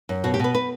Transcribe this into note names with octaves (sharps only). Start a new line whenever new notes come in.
F#2
B2 F#4
G4
B2 B4
B4